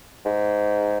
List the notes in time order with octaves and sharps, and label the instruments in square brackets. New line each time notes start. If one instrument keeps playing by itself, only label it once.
[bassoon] G#2